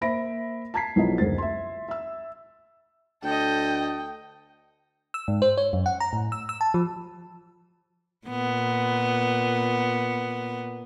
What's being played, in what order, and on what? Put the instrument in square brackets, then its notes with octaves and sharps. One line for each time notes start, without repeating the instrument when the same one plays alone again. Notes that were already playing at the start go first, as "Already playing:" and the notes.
[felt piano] A#3 C5 E5 B5 A#6 D7
A5 A#5 G#6 B6 C7
B1 F3 B3 E4 F#4 D#5
F#1 D2 C5 A6
E5 C6
E5 E6
[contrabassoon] D2 [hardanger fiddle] A4 D#5 [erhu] G5
[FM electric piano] E6
G#2
C5
C#5
F#2
F#5
A#5
A2
E6
E6
A5
F3
[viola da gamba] A#2 B3